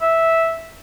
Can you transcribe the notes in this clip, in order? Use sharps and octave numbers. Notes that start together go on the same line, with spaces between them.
E5